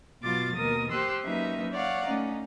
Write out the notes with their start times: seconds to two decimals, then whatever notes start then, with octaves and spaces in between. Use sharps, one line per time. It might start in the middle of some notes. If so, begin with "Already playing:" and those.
0.24 B2 F#3 F4 D6 A6
0.56 D#2 B2 A#4 D#6
0.92 G4 C5 C6 E6 F#6
1.24 F#3 A#3 C#4 D#4 B4 E5
1.73 C#5 D5 F5 F#5
2.06 A3 C#4 D#4